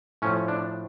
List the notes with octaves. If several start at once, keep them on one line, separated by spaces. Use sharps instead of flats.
A2 F3 C#4
D4